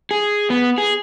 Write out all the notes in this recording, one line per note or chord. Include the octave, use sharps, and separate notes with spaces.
G#4
B3
G#4